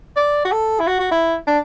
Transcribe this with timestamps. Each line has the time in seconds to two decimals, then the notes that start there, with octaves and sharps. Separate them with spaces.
0.16 D5
0.45 F#4
0.52 A4
0.80 E4
0.87 F#4
1.00 F#4
1.11 E4
1.47 D4